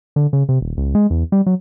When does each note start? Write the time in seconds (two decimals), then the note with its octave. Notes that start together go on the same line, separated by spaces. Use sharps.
0.16 D3
0.33 C#3
0.49 C3
0.61 D#1
0.77 C#2
0.95 G#3
1.10 E2
1.32 G3
1.46 F#3